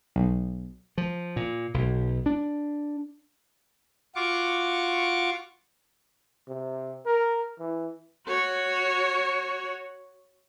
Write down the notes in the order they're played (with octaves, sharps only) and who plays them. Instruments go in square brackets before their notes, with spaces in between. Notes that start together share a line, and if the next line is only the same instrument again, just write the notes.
[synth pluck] B1
[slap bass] F3
A#2
B1
D4
[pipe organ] F4 F#4 C#6 D6
[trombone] C3
A#4
E3
[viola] F#4 C#5